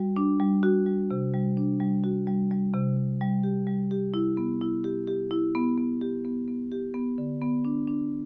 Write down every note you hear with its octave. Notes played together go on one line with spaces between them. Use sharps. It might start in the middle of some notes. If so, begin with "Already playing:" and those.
Already playing: G3 F#4
D4
G3
F#4
G3
C3
G3
D4
G3
F#4
G3
G3
C3
C3
G3
G4
G3
G4
E4
B3
E4
G4
G4
E4
B3
B3
G4
B3
B3
G4
B3
D3
B3
D4
D4